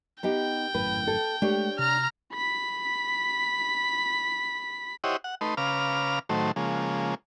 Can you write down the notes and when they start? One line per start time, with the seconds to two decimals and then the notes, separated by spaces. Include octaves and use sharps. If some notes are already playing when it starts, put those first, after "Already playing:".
0.23 B3 D#4 G4 G5
0.74 G#1 F#2 A2 B4
1.07 A4
1.42 G#3 A3 D4 G4 C#5
1.79 C3 A#5 F6
2.33 B5 B6
5.04 E4 G4 C5 C#5 D#5 F#5
5.24 F#5
5.41 A3 D#4 B4 C6
5.57 C#3 B4 F5 A#5 D6 F6
6.29 A2 D#3 F#3 A3 C5
6.56 C#3 F3 G#3 A#3